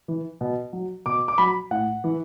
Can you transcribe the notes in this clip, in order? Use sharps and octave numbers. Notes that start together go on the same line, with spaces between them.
E3
B2
F#3
B2 D6
D6
F#3 B5
A2 F#5
E3